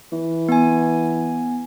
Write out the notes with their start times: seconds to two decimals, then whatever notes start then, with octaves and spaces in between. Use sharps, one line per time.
0.12 E3
0.49 B3 G#5